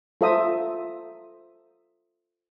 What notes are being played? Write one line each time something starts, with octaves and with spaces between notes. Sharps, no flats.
F4 A4 C5 E5 A#5 D#6